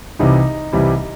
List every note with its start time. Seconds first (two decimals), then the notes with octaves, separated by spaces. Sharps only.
0.19 C2 C3 E3 G3 D#4
0.73 C2 C3 E3 G3